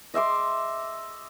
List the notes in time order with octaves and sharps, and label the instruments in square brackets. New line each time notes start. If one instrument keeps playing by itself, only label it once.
[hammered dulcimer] D#5 E5 C6 D6